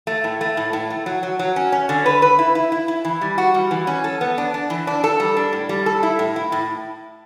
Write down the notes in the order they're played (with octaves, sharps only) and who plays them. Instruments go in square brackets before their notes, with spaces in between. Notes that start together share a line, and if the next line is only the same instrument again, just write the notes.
[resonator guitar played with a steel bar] A3
A2
A3
A2
A2
A3
F#3
F#3
F#3
C#4
C#4
D3
B4
B4
E4
E4
E4
E4
E3
G3
F#4
G3
E3
C#4
A4
B3
D4
D4
E3
D4
A4
G3
D4
A2
G3
A4
E4
A2
E4
A2